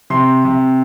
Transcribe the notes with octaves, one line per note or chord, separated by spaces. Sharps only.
C3 C6
C3